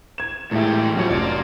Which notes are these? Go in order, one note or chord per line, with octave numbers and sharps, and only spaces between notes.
G#6 E7
E2 A2 G#3 G4 E5
E2 B2 F3 F#3 C#4 C#5
F1 F4 D5